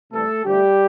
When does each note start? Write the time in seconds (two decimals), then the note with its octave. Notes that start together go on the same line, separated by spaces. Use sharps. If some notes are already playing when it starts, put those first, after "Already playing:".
0.12 C3 E3 G3 A3 A4
0.44 D3 F3 G3 A3 G4